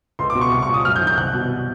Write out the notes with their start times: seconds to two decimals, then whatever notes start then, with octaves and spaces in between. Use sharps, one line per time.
0.19 C#2 C6
0.30 D6
0.35 B2
0.41 C#6
0.52 C2 C#6
0.62 C#6
0.69 A#2
0.74 D#6
0.85 F#2 F6
0.96 G6
1.01 D#3
1.07 G6
1.17 C2 F#6
1.34 B2